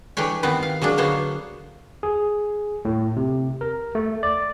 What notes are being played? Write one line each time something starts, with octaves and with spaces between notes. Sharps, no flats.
E3 A3 D4 G4 C#5
D#3 B3 C4 E4
F5
F#3 G#3 A#3 D4
D3 A#3 B3 C5 C#5
G#4
A2
C3
A#4
A3
D5